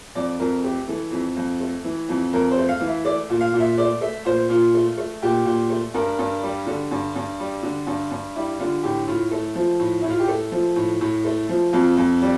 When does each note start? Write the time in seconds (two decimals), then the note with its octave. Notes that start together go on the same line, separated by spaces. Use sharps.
0.15 F2 D5
0.39 F2 A#4
0.64 A3 G4
0.88 E3 A4
1.12 F2
1.37 F2
1.60 A3
1.85 E3
2.09 F2
2.33 F2 A#4
2.51 C5
2.57 A3
2.69 F5
2.81 E3
2.87 E5
3.05 A3 D5
3.30 A#2
3.41 F5
3.54 A#2
3.60 E5
3.78 A3 D5
4.01 A3 E5
4.25 A#2 C5
4.49 A#2 F4
4.74 A3
4.98 A3
5.22 A#2 G4
5.46 A#2
5.70 A3
5.94 G2 A#4
6.19 G2
6.43 G3
6.66 D3 A4
6.91 G2
7.15 G2
7.39 G3
7.63 D3
7.87 G2
8.11 G2
8.36 G3 E4
8.60 D3 F4
8.83 A2 G4
9.07 A2 F4
9.31 A3 A4
9.55 F3
9.80 A2
10.01 A2 E4
10.10 F4
10.20 G4
10.28 A3 A4
10.52 F3
10.76 A2
11.01 A2
11.25 A3
11.49 F3
11.73 F2 F4
11.97 F2
12.22 G3